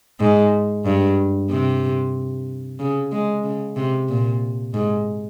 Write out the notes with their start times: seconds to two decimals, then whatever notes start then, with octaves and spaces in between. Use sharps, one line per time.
0.20 G#2
0.85 G2
1.50 C3
2.79 C#3
3.12 G#3
3.44 C#3
3.76 C3
4.09 A#2
4.74 G#2